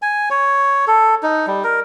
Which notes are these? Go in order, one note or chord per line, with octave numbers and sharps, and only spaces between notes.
G#5
C#5
A4
D#4
G3
A#4